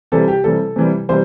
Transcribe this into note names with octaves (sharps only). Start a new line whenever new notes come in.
C3 E3 G3 A4
G4
C3 E3 G3 A4
C3 E3 G3
C3 E3 G3 C5